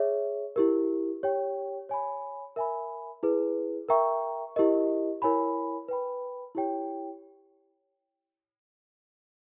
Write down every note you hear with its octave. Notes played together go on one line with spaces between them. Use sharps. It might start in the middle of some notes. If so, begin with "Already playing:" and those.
Already playing: G#4 C#5 E5
E4 G4 A#4
G4 C#5 G5
C#5 G#5 B5
A#4 E5 G#5 B5
E4 G#4 B4
A#4 E5 G5 A#5 C#6
E4 G4 A#4 D#5
E4 A#4 C#5 G#5 B5
B4 G5 B5
E4 G4 C#5 G5